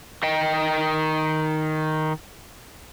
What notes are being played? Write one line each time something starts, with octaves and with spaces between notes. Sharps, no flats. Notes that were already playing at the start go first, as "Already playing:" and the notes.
D#3 D#5 G5